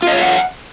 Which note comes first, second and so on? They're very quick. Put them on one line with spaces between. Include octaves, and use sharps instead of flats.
F4 D#5 C#5 E5 F#5